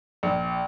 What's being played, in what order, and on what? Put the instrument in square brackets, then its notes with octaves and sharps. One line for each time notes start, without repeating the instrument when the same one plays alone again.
[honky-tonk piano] A#1